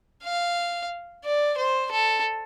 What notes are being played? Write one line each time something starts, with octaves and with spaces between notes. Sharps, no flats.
F5
D5
C5
A4